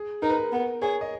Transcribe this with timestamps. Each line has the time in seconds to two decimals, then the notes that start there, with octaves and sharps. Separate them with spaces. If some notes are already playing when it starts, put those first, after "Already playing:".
Already playing: G#4
0.22 D#4 A#4
0.29 B4
0.38 A#4
0.52 B3
0.82 G#4 C#5
1.01 D#5